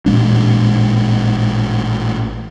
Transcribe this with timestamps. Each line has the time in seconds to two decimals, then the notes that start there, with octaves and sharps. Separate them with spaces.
0.06 A1 A#2 G#3 D4